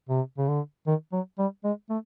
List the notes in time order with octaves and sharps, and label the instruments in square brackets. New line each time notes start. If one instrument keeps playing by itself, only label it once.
[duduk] C3
C#3
D3
D#3
F#3
G3
G#3
A3